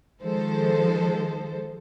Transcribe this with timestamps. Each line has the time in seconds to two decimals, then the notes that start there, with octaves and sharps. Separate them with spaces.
0.21 D#3 F3 G#3 A4 C5